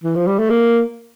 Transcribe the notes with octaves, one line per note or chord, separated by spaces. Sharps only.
E3
F3
G3
A3
A#3